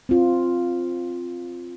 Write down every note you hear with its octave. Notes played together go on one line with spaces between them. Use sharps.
C4 F4